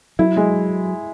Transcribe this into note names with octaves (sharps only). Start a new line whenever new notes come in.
F#3 E4
G#3